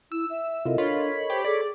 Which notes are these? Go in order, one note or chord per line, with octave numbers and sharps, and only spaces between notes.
E4 E6
E5
C3 E4 F4 A4 A#4 D#5
D4 F4 C#5 B5
G4 C5
G#4 A4 D5 D6